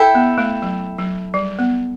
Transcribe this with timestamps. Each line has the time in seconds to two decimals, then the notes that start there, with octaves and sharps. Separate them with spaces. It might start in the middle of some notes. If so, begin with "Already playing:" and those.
Already playing: E4 A4 E5 G5
0.15 B3
0.38 A3
0.62 F#3
0.98 F#3
1.34 G3
1.59 B3